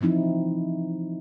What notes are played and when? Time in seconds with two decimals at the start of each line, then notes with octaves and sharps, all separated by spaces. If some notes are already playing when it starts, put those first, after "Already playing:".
0.01 E3 F3 C4 D#4 E4